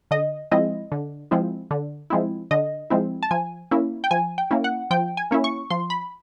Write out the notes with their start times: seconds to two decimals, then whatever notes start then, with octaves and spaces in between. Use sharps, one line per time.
0.11 D3 D#5
0.51 F3 G#3 C4 E4 D#5
0.92 D3
1.31 F3 G#3 C4 E4
1.71 D3
2.10 F3 G#3 C4 E4
2.51 D3 D#5
2.90 F3 G#3 C4 E4
3.23 A5
3.31 F3 G#5
3.71 A#3 C#4 E4
4.04 G5
4.11 F3 G#5
4.38 G5
4.51 A#3 C#4 E4
4.64 F#5
4.91 F3 G5
5.17 G#5
5.31 A#3 C#4 E4
5.44 C#6
5.70 F3 C6
5.90 B5